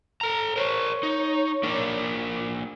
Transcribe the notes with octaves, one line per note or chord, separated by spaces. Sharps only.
A4 A#5
A#4 C5 C#5
D#4
A#3 D4 A#4